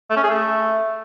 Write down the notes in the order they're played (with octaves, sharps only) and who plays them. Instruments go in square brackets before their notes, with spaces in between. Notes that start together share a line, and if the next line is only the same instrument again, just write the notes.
[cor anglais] A3
C#4
G#4
A3